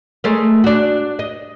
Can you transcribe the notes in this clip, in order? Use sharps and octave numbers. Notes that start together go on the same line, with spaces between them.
G#3 A3 A#4
D4 F#4
D#5